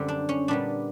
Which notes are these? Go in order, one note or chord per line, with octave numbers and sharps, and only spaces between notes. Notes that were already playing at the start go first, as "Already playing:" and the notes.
Already playing: F#2 D3 G3 C4 G4
D4
C#4
A#2 G3 B3 D4